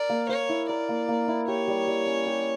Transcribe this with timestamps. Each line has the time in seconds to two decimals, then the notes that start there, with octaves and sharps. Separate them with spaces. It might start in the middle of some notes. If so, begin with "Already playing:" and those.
Already playing: A#4 D5
0.09 A#3
0.29 A#3 C#5
0.49 E4
0.69 A#4 D5
0.89 A#3
1.08 A#3
1.28 E4
1.48 G4 C#5
1.68 G3
1.87 G3
2.07 C#4
2.27 G4